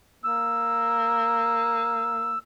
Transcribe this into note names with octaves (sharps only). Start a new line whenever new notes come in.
A#3 E6